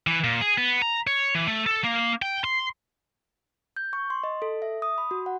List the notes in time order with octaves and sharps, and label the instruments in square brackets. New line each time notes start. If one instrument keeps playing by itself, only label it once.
[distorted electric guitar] E3
A#2
G#4
B3
A#5
C#5
E3
A3
A4
A#3
G5
C6
[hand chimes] G6
C#6
C6
D#5
A4
E5
D#6
B5
F#4
F#5